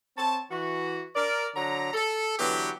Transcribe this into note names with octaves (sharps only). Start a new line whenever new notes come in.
C4 C#5 A5
E3 F#4
A#4 D5
D3 F#3 A#5
A4
D3 E3 F#3 B3 G4